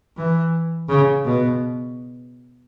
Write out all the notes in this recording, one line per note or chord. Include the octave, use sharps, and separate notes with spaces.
E3
C#3
B2